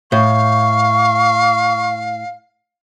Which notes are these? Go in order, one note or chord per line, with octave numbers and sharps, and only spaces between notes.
A2 F5 C#6